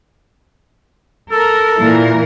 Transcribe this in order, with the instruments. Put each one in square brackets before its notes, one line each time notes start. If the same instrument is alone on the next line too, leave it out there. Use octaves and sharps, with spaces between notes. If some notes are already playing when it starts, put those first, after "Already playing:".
[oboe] A4 [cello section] A#4
[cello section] A#2 E3 A#4